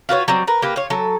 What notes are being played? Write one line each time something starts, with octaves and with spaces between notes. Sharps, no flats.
F4 F#4 B4 C#5
F#3 G3 C4
A#4 B4
A#3 G4 B4
F4 C#5
F#3 A4